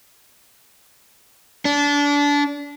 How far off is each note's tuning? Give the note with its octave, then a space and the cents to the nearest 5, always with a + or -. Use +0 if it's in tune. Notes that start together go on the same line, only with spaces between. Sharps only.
D4 -25